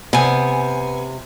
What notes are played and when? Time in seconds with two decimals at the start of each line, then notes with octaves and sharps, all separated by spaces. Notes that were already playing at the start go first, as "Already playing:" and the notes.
0.13 C3 B3 G#5